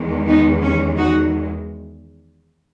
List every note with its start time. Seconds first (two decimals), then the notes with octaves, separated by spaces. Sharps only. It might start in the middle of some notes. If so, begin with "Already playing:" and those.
Already playing: E2 D#3 G#3
0.28 B3 D#4
0.62 C#4
0.97 D#4 F#4